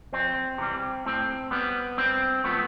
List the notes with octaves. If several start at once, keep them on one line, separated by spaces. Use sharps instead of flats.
F2 C4
C3 E3 G3
A2 C4
G3 B3
G2 C4
F3 A3 B3